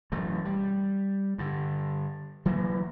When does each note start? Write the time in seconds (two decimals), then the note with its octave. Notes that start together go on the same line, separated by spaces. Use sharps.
0.12 E1 F#2 E3 A3
0.45 G3
1.38 G2 D3
2.45 E3 F#3 A#3